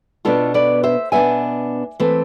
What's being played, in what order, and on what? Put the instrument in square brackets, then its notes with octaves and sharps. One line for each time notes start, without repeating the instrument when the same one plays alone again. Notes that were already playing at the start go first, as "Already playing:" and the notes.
[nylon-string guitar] B2 B3 D4 F4 A4
B4 D5
C5 E5
B2 B3 D4 E5 G#5
E3 A3 C4